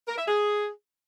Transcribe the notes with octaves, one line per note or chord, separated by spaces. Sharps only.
A#4
E5
G#4